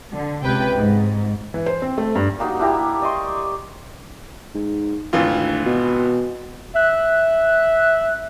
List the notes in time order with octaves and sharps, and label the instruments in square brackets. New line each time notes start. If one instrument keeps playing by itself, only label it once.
[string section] D3
C#2 C3 B4 G5
G#2
[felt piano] E3
C5
C4
A3
G2
[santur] G3 A#3 D#4 F#4
D4 E4 G4 A#5
D5 D#5 C6 C#6
[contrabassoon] G#2
[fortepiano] G#1 E3 F4 [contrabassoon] D2
[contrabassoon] B2
[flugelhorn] E5 [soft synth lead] F#6